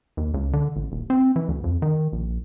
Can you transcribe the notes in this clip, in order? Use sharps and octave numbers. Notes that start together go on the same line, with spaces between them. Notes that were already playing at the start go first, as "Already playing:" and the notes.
D#2
C#2
D3
A1
D#1
C4
E3
D2
F2
D#3
A#1